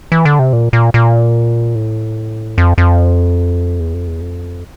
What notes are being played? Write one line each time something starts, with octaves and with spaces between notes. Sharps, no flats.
E3
D3
C3
A#2
A#2
A#2
A2
F2
F2
E2
F2
E2
F2